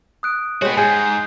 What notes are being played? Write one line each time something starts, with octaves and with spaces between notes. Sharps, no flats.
D#6 F#6 D7
G#3 B3 F#4 C#5 G5
G#2 G#4 G#5 G6 C7